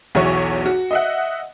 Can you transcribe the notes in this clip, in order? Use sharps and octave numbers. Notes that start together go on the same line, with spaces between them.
B1 E2 E3 F#4 C#5 C#6
F#4
D#5 E5 F#5